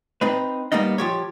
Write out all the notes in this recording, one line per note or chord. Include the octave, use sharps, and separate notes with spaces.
C4 D#4 B4
G3 A#3 B3 D#4 D#5
F3 G4 C#5